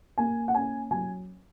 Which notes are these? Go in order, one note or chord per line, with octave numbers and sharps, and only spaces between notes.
A#3 G#5
F#5
C#4 G#5
F#3 G#5